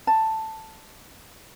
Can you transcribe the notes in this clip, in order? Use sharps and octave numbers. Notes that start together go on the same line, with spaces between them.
A5